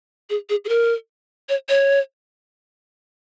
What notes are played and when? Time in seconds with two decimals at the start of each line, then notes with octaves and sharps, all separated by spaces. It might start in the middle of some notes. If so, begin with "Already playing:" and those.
0.30 G#4
0.50 G#4
0.65 G#4
0.69 A#4
1.49 C#5
1.69 C#5